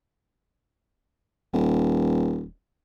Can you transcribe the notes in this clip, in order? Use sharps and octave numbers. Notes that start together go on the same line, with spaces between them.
D#1